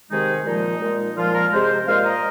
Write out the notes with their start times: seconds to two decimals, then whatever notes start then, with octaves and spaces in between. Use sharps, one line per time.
0.11 C3 D#3 G#3 D#4 G#4
0.46 A#2 F3 G#3 D#4
0.81 A#2 G#3
1.16 A#2 F3 G#3 F4
1.33 F4 A#4
1.51 C3 G#3 G#4 C5
1.86 A#2 G#3 C5 F5
2.04 A#4 D#5